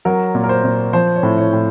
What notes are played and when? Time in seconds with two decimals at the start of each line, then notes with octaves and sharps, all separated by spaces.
0.05 F#3 A#4
0.35 A#2
0.44 A#4
0.49 C5
0.64 A#2
0.93 F3 C5
1.16 C#5
1.23 A2
1.38 C#5
1.53 A2